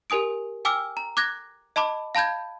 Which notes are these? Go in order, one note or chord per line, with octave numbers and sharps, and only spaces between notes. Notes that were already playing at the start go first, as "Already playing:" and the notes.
G4 A#4 G#5 D#6 D7
G5 G#5 D6 E6 F6
A#5
D6 F#6 G#6 A#6
D#5 A5 B5 D6
F5 A5 B5 G6 G#6